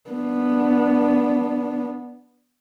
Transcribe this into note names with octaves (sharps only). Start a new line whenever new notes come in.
B3 D4